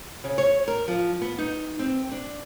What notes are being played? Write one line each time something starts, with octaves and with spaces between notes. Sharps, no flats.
C#3
C#5
A#4
F3
B3
D#4
C4
D4